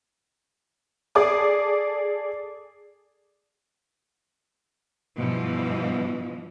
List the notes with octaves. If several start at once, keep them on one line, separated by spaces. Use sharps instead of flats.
G#4 A4 D5 D6 D#6
G2 B2 E3 F3